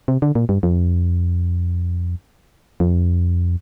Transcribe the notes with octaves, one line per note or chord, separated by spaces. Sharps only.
C3
D3
A#2
G2
F2
F2